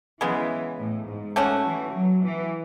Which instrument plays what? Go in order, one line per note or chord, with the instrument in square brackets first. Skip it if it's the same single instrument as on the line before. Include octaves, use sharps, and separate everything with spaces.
[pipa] C#3 G#3 B3 [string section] E3
[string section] A2
G#2
[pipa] A3 C#4 F#4
[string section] E3
F#3
E3